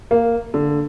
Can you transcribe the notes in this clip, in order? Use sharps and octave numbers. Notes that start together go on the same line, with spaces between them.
A#3
D3